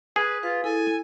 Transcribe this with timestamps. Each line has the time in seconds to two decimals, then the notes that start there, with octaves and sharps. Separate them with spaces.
0.16 G#4 B4
0.43 F4 B4 F5
0.64 E4 A4 G#5